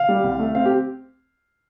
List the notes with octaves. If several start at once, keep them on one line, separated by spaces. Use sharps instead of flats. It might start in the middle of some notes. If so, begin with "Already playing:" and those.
Already playing: F5
G3
C2
A3
C4 F5
G4